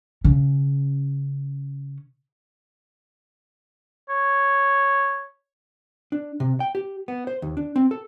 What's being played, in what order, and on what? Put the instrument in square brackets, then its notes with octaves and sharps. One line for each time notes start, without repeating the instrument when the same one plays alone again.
[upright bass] C#3 C#4
[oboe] C#5
[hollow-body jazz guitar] D4
C3
G5
G4
B3
C5
D#2
D4
C4
A4